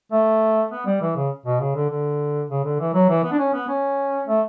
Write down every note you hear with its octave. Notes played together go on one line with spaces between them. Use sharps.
A3
B3
G3
E3
C#3
B2
C#3
D3
D3
C#3
D3
E3
F#3
E3
B3
D4
C#4
B3
C#4
A3